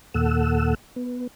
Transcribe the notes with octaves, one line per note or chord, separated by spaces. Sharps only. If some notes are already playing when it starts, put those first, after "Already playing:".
D#2 A#2 A4 F#5 E6
B3